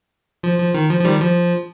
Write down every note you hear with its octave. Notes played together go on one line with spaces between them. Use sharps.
F3
F3
D#3
F3
F3
D#3 G3
F3